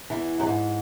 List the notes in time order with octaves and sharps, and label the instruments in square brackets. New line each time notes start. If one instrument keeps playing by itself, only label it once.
[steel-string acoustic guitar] E2 E3
F#2
G#2